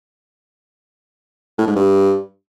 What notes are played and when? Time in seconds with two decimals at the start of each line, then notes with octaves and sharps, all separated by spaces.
1.58 A2
1.67 G#2
1.75 G2